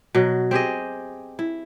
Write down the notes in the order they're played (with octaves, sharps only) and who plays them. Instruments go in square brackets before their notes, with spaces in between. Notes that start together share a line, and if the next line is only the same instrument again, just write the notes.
[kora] B2 F#3
C4 G4 G#4 D#5
E4